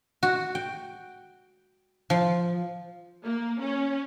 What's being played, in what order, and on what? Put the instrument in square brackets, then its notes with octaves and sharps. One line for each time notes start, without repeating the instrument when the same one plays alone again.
[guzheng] F#4
G5
F3
[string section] A#3
C#4